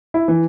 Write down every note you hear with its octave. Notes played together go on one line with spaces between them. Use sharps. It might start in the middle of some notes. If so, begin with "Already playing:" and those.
E4
E3